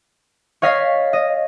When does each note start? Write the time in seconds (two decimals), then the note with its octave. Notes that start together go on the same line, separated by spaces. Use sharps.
0.62 C#5 D#5 F5 A6 B6 C7
1.13 D#5